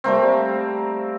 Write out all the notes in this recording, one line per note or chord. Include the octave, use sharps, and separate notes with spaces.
G3 A3 A#3 C4